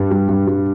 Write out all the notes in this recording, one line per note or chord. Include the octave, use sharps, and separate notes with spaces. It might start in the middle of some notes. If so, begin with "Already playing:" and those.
Already playing: G2 G3
G3
G2
G3